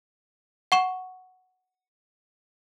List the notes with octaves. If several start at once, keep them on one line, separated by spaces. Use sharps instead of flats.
F#5 C#6 E7